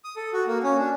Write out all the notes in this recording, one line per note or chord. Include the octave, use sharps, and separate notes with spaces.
D#6
A4
F#4
A#3
C#4
D4